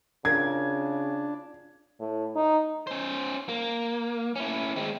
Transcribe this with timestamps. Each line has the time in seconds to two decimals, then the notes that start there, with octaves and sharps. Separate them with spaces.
0.25 C#3 D4 F4 F#4 A#4 G#6
2.00 A2
2.36 D#4
2.87 C#4 C5
3.49 A#3
4.36 C#4 E4
4.76 G#3 C4